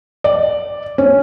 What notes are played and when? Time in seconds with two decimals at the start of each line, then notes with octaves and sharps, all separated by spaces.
0.24 D5
0.98 C#4